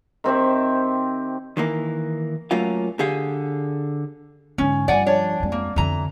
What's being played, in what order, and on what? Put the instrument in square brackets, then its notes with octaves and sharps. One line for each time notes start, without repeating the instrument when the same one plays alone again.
[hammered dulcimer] D#3 C4 G4 E5
[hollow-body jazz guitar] D#3 E3 A#3
F#3 A3 A#3 C#4 F4 F5
D3 G4 G#4 F5
[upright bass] G#2 D3 [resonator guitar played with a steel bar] C#4
[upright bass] G2 F3 [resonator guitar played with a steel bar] D5 F#5 G#5
[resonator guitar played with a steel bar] D4 C#5
[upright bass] F2 G#3
[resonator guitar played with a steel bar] A#3
[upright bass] F2 D3 [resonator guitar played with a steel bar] E3 A#5